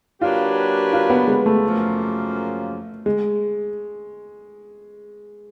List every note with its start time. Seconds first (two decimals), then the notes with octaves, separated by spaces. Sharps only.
0.21 F#3 A#3 D4 F4 G4 B4
0.93 F4
1.10 B3
1.28 G#3
1.46 A3
1.63 F#2 C#3 F3 A#3
3.06 G#3